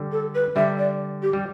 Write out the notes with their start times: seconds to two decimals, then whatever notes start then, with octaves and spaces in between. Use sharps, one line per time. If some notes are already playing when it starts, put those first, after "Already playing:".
Already playing: D3 G3
0.12 A4
0.35 B4
0.56 D3 G3 E5
0.78 D5
1.22 G4
1.33 G3